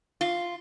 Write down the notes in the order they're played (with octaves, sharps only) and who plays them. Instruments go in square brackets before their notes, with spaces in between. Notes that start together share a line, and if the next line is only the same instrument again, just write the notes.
[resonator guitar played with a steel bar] F4